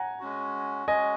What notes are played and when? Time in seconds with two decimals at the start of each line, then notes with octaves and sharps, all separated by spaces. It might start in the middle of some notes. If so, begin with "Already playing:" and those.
Already playing: F#5 G#5 A#5
0.20 G#3 C#4 F#4
0.87 G#3 C#4 F#4 D#5 G#5